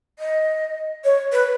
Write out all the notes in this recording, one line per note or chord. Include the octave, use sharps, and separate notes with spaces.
D#5
C#5
B4